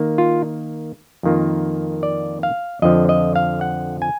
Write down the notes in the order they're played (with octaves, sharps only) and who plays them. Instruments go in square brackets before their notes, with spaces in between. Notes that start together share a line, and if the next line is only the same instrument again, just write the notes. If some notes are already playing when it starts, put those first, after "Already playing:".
Already playing: [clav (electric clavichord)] D#3 A#3
F4
F2 D#3 A#3 F4
D5
F5
F2 D3 F3 D#5
D#5
F5
F#5
G#5